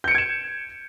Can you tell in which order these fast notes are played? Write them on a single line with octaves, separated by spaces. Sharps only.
G6 C#7 D7 G#6 E7